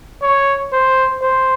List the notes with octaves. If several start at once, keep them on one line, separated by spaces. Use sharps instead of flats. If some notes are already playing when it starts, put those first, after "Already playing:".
C#5
C5
C5